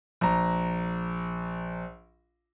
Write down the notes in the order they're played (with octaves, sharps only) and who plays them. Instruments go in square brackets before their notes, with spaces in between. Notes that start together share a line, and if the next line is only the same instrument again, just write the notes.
[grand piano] A#1 A#5